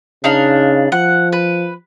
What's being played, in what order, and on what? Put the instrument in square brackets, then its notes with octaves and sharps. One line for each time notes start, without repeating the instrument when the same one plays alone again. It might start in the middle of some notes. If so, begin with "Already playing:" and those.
[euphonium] C#3 [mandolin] D4 D#4 F5
[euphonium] F3 [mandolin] F#5
[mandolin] B4